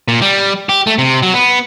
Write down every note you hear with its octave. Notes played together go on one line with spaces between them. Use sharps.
A#2
G3
G4
A3
C3
F#3
B3